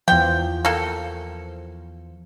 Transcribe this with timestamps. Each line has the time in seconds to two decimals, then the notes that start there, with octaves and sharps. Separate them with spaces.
0.08 E2 F3 G5
0.65 A#3 A4